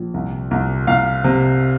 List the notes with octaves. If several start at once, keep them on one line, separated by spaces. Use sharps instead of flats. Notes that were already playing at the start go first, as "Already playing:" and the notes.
Already playing: A#1
C2
C2
C2 F5
C3